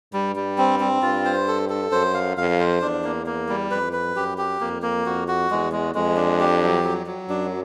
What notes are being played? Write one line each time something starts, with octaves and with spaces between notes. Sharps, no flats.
G2 G3
G3
C4
C4
G2 F4
C5
A4
A4
F#2 C5
F5
F2 F5
C5
E2 D4
A#3
A#3
G3
F2 B4
B4
F#2 G4
G4
F2 A#3
A#3
F2 F#4
F#4
E2 G#3
G#3
F2 G#3
D4
G4
F#3
F#3
F#3
F#2 D4